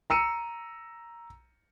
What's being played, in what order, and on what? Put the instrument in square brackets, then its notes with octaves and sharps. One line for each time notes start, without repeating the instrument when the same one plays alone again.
[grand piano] A#5 E6 C#7 D#7